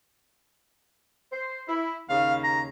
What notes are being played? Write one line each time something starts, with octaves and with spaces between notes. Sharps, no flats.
C5
E4
D#2 C#3 F5
A#5